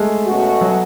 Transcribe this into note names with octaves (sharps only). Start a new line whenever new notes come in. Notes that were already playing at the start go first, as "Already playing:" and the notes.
Already playing: G#3 A3
B2 A3 C#4 F#4
F#3